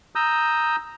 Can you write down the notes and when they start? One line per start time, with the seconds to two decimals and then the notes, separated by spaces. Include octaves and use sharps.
0.15 A#5 D#6 E6 G6